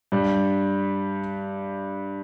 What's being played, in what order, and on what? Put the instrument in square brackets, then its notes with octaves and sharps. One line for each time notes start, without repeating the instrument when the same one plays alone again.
[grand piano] G2 G3